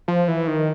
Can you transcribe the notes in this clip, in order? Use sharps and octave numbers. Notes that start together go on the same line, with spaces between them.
F3
E3
D#3